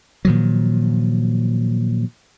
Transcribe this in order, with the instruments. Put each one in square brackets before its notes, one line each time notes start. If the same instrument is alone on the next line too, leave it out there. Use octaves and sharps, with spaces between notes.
[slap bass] A#2 D#3 F3 F#3